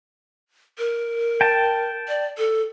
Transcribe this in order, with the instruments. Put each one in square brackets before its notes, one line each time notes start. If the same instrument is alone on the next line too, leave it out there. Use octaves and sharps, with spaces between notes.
[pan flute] A#4
[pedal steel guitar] G5 A5
[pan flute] D5
A4